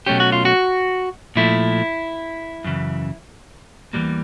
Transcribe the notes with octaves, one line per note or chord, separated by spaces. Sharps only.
B2 F#3 A3 C#4 G4
F#4
F4
F#4
A#2 F3 A3 E4
F#2 C#3 E3
E2 C#3 E3 G3 A#3